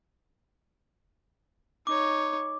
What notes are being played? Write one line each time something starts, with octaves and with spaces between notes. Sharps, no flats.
D#4 C#5 D6